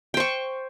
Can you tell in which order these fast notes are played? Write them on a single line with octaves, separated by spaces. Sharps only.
G5 C5 C#6